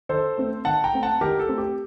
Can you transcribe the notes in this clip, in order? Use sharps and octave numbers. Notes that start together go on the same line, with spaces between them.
D#3 A4 C5
A3 C4
D#3 F#5 A5
G5 A#5
A3 C4
F#5 A5
D#3 G4 A#4
A4
A3 C4
G4